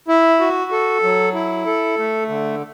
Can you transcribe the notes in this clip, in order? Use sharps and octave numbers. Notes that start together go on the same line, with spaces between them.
E4
F#4
A4
F#3
E4
A4
A3
D3